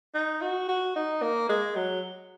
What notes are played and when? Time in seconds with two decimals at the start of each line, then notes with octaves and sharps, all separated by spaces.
0.15 D#4
0.42 F#4
0.69 F#4
0.96 D#4
1.22 A#3
1.49 G#3
1.76 F#3